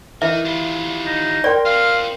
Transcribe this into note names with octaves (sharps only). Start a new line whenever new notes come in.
E3 A#4 D#5 E5
G3 F4
D#4
A#4 D5 G5 C6
C4 F4 F5